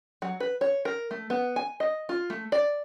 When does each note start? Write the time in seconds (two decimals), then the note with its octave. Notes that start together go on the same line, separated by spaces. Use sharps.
0.22 F#3
0.40 B4
0.61 C#5
0.85 A#4
1.11 A3
1.30 B3
1.56 G#5
1.80 D#5
2.09 F4
2.30 A3
2.52 D5